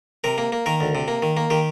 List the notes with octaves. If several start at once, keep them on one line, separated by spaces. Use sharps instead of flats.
C3 A#4
A#3
A#3
D#3 A#4
D2
C3
A#3
D#3
A#3
D#3 G4